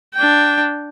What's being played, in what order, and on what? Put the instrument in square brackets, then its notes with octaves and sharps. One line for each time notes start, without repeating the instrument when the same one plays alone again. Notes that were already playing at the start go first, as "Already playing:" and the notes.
[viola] D4 G5